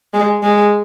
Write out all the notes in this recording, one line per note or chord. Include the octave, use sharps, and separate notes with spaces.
G#3
G#3